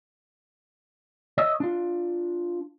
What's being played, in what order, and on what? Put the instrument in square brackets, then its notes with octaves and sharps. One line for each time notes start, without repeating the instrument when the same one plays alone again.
[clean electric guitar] C#5 D#5 E5
D4 F4